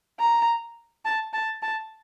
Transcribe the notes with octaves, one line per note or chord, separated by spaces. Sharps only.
A#5
A5
A5
A5